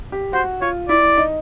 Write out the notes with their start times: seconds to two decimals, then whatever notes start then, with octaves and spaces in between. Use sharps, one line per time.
0.12 G4
0.33 F#4 C5
0.61 F4 C#5
0.89 E4 D5
1.17 D#4